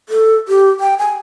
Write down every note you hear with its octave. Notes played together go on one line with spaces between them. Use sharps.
A4
G4
G5
G#5